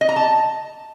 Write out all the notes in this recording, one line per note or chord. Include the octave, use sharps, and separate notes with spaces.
D#5
A#5
A5